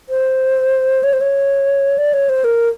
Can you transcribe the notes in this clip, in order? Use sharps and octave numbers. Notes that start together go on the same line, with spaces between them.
C5
C#5
C5
C#5
D5
C#5
C5
A#4